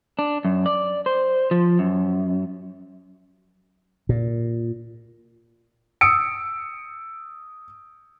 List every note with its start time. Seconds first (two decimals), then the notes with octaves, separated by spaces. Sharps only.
0.19 D4
0.45 F#2
0.66 D5
1.06 C5
1.51 F3
1.79 F#2
4.09 A#2
6.01 D#6 E6 C#7 D7